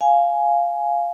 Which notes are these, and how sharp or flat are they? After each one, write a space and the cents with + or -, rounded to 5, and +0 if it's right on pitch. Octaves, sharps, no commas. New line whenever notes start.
F5 +0 G#5 +10